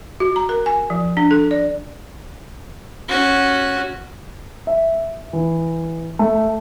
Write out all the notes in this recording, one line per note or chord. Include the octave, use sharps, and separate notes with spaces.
F#4
A#5
A#4
G#5
F3
D4
A4
D5
C#4 F#4
E5
E3
A3